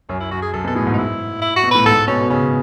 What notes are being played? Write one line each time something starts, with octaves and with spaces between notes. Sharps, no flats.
F#2 C#4
E4
F#2 F#4
G#4
F#2 A4
B2 A4
A2 G#4
G#2
D#4
E4
E4
F#4
B2
A2 B4
G#2 A4
B2 C#4
B2
C#3 C#4